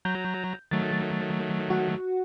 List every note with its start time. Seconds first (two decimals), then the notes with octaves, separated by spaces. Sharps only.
0.05 F#3 A#5 G6
0.71 D#3 F#3 A3 A6
1.70 F#4 F#5